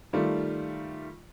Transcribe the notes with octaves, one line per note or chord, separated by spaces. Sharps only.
D#3 G3 A3 F4